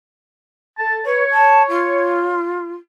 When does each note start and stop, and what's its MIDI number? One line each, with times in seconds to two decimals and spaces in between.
0.78 1.00 69
0.78 1.00 81
1.06 1.23 71
1.06 2.38 73
1.31 1.62 81
1.69 2.73 65